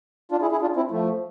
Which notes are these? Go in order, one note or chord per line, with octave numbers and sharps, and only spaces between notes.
D4 F4
E4 G#4
E4 G#4
D4 F4
C4 E4
F3 A3